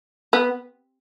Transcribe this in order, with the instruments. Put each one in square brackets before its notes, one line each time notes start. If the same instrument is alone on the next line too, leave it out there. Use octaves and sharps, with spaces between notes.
[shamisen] B3